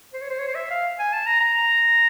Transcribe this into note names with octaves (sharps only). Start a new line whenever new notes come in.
C5
C#5
C5
C#5
C5
E5
F5
G#5
A5
A#5
A#5